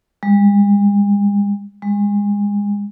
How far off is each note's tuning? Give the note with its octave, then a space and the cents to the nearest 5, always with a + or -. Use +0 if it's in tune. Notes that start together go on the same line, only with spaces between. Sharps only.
G#3 -45
G#3 -30